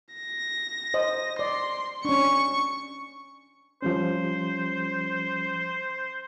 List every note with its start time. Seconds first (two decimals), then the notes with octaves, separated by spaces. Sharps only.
0.15 A#6
0.94 C5 D#5
1.39 D5 C6
2.05 C#4 D4 C#6
3.82 F3 G3 C#4 C5